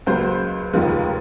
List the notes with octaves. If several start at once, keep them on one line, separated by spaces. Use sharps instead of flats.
C#2 C#3 F#3 A#3 C5
F1 D#2 C#3 F3 G#3